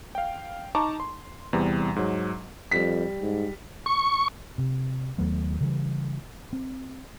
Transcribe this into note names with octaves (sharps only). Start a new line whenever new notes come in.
F5 G5
D#4 A5 A#5 C#6 D6
C6
E2 C3 E3 G3
G#2 F#3
F2 G3 B6
G#2
C#6
C3
D#2 F#3 A3 B3
C#3 E3 G3
C4